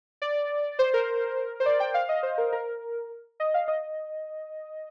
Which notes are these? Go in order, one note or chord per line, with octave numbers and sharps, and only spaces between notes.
D5
C5
A#4
C5
D5
G5
F5
D#5
C5
A#4
A#4
D#5
F5
D#5